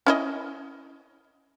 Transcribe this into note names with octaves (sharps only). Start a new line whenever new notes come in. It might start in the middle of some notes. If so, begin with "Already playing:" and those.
C#4 E4 D#5